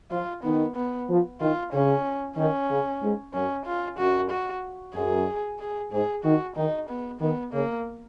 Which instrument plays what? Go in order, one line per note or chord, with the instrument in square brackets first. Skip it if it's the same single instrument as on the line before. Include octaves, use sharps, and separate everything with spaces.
[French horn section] F3 [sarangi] F4
[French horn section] D#3 [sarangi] B3
[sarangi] B3
[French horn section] F3
[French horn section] D#3 [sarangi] F4
[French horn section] C#3 [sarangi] C#4
[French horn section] D#3 [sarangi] C#4
[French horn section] C#3
G#2
[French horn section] F#2 [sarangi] C#4
[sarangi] F4
[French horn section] F#2 [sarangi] F#4
[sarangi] F#4
[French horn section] F#2 [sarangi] G#4
[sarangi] G#4
[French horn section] G#2 [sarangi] G#4
[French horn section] D#3 [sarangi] F#4
[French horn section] D#3 [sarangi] D#4
[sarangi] B3
[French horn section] D#3 [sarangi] B3
[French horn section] C#3 [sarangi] A#3